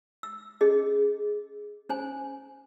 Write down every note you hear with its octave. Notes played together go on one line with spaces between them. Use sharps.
E6
C#4 G#4 D#5
C#4 C5 G#5